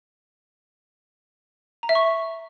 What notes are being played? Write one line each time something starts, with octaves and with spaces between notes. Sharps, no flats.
A#5
E5
C#6